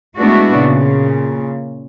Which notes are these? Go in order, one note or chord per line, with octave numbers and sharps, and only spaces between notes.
G#3 A3 B3 D4 E4 F#4
A#2 C#3